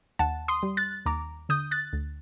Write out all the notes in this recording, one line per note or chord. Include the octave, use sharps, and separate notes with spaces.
D#2 F#5 A5
C6 D#6
G3
F#6 A6
D#2 A#5 D6
D3 D#6 G6
F#6 A6
D2